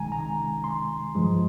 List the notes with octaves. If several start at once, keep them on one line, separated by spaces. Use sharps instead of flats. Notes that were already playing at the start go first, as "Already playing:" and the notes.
Already playing: C2 C3 D#3 G#3 G#5 A#5
A#5
C6
G2 F3 G#3